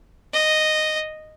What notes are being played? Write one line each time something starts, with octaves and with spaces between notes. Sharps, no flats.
D#5